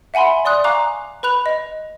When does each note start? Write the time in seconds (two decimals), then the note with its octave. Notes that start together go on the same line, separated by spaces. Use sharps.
0.14 E5 F#5 G#5 B5 C6
0.45 D5 C6 D#6 F#6
0.64 F5 G#5 A#5 C#6 D6 F#6
1.23 B4 B5 F#6 F7
1.46 D#5